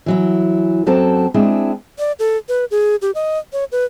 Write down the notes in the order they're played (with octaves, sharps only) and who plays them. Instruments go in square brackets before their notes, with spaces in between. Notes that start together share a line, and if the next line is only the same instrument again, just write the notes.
[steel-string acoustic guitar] E3 F#3 E4
F#2 F#3 C4 A4 A5
G#3 C4 D4 E4 G#4
[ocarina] D5
A4
B4
G#4
G4
D#5
C#5
B4